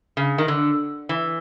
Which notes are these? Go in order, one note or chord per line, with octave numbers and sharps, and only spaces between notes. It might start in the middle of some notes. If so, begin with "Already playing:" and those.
C#3
D#3
D3
E3